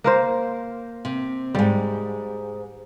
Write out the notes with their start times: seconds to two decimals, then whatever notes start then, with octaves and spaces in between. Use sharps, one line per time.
0.04 A#3 A#4 C5
1.05 C3
1.55 E2 G#2 G3